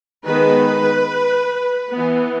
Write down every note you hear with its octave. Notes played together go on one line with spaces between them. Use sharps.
D#3 G#3 B3 B4
B3
E3